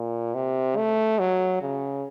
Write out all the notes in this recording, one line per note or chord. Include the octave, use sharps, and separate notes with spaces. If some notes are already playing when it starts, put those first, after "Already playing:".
Already playing: A#2
C3
A3
F#3
C#3